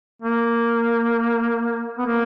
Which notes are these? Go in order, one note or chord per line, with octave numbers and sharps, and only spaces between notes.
A#3
B3
A#3